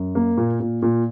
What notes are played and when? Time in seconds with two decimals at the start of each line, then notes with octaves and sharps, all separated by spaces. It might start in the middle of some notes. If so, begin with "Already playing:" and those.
Already playing: F#2
0.15 A#3
0.37 A#2
0.60 A#2
0.82 A#2